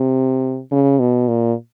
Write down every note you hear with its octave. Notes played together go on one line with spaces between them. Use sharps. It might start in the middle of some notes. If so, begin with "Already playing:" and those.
Already playing: C3
C#3
B2
A#2